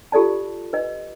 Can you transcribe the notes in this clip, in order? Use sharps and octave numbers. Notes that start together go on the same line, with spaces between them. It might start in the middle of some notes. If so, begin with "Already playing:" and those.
F4 G4 A4 D5 A5
B4 D#5